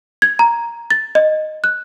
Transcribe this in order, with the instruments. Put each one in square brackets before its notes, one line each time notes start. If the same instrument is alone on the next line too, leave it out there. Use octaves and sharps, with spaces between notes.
[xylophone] G#6
A#5
A6
D#5
F#6